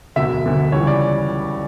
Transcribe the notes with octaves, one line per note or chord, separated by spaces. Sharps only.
E1 D2 D3 F#3 E5
E1 D2 D3 F#3
C#2 C#3 E3 G3 C#5
D5